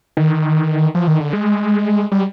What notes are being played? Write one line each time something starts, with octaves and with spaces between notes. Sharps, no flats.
D#3
F3
D#3
D3
G#3
G3